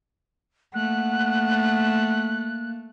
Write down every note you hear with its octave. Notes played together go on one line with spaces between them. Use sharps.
A3 A#3 F#5 F#6